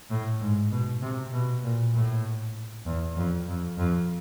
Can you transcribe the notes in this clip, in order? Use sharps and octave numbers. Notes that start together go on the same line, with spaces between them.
A2
G#2
B2
C3
B2
A#2
A2
E2
F2
F2
F2